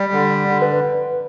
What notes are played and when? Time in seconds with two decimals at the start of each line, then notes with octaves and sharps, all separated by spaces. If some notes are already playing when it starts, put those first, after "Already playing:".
Already playing: G3
0.12 D3
0.48 D3
0.62 B4